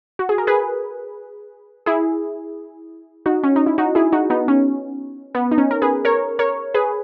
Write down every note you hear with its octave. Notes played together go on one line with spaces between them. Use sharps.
F#4
G#4
A#4
G#4 B4
E4 G#4
D#4 F#4
C#4
D#4
E4
D#4 F#4
E4 G#4
D#4 F#4
B3 D#4
C#4
B3
D#4
C#4
A#4
G#4 B4
A#4 C#5
A#4 C#5
G#4 B4